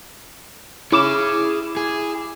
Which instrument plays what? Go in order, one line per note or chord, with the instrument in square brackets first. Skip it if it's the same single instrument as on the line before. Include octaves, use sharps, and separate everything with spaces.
[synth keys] E4 D6 E7 [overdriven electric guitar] G#4 C#5
[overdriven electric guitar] G#4